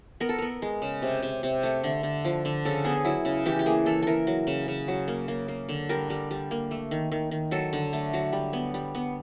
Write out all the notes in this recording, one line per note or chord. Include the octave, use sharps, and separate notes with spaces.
B3 A#4
A4
B3 A#4
G#3
C#3
C3
C3
C3
A3
D3
D3
F3
D3
C#3 A4
B3 G#4
F#3 E4
C#3
E3 G4
G4
A#3 G#4
E3 A4
E3 A4 A#4
F#3
C#3
C#3
F#3
A#3
A#3
A#3
D3
G3 A#4
G3
G3
A#3
A3
D#3
D#3
D#3
F#3 A4
D3
A3
F#3
G3
B3
G3
B3